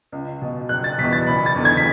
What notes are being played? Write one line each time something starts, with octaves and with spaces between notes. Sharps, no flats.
C#2
B2
F#1 F#6
A6
E2 B2 B6
A6
F#1 B5
A6
E2 D3
G#6
B6